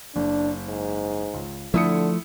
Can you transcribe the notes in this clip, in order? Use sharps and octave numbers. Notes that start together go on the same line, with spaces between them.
F#1 D4
G#2
C#2
D3 F3 A3 E4 D#6 C#7